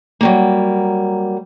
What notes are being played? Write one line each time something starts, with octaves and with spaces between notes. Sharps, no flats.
F#3 G3 A#3